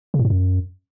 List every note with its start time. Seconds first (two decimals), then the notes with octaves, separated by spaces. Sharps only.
0.14 C#3
0.19 A2
0.25 G#2
0.30 F#2